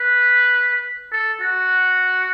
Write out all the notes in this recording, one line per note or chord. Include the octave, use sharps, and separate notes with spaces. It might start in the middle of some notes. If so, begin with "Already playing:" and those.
Already playing: B4
A4
F#4